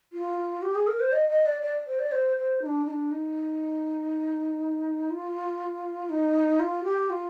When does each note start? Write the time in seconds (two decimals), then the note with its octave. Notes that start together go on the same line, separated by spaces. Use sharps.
0.13 F4
0.62 G4
0.75 G#4
0.87 A#4
1.00 C5
1.12 D#5
1.29 D#5
1.46 D5
1.62 D5
1.87 C5
2.00 D5
2.12 C5
2.37 C5
2.62 D#4
2.66 D4
2.86 D#4
2.90 D4
3.11 D#4
5.11 F4
6.10 D#4
6.60 F4
6.84 G4
7.10 F4